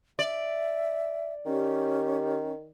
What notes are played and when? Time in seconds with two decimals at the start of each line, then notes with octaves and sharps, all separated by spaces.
0.19 D5 E5
1.46 D#3 C#4 G4